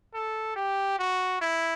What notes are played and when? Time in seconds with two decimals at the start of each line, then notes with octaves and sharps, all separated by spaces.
0.14 A4
0.56 G4
0.99 F#4
1.41 E4